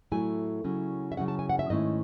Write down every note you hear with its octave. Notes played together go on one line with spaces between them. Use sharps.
A2 F#3 A3 E4 G#5
C#3 F#3 C#4 E4
E5
C#3 F#3 C#4 E4 F#5
A5
G#5
F#5
E5
G#2 D#3 A3 C#4 E4 D#5